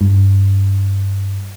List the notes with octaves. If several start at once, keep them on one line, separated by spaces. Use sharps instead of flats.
G2